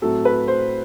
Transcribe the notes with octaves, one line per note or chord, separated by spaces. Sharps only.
A2 F#3 C4 A4
B4
C5